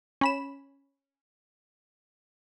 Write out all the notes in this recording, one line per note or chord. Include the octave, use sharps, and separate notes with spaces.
C#4 B5 E7